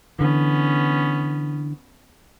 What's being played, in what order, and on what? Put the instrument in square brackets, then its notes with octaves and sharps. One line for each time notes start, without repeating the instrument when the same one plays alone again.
[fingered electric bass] D3 E3 [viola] B3 C#4